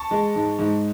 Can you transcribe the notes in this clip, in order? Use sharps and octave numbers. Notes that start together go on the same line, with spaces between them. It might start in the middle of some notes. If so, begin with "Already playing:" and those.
Already playing: A5 C#6
G#3
G#2
G#2